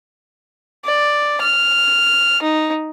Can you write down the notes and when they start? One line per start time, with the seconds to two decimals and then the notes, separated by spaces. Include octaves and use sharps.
0.86 D5
1.42 F6
2.42 D#4